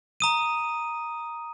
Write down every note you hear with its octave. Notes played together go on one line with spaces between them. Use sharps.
A#5 D#6 D#7